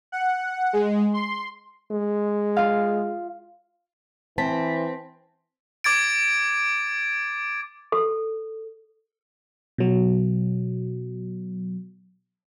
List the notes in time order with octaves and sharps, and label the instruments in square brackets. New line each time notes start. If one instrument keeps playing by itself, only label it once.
[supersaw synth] F#5
G#3
C6
[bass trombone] G#3
[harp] F4 F5
[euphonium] E3 [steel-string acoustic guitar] C4 [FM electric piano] A5 B6
[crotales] D6 G#6 A6 D7
[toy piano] A4
[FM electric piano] B2 F#3